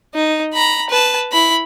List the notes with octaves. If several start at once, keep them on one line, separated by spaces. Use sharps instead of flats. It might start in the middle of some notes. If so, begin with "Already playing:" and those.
D#4
A#5 B5
B4 A5
E4 B5